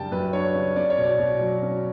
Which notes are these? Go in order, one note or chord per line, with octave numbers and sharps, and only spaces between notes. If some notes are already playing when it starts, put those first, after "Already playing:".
Already playing: F#2 C#3 G3 D4 G5 A5
F#2 B4
D4 C#5
C#3
C#4 D5
C#5
B2
D5
B2
F#3
C#4